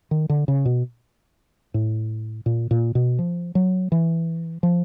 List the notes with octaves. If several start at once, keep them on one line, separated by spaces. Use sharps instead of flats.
D#3
D3
C#3
B2
A2
A#2
A#2
B2
F3
F#3
E3
F3